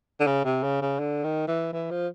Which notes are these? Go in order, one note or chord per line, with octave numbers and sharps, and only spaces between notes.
D3
C#3
C3
C#3
C#3
D3
D#3
E3
E3
F3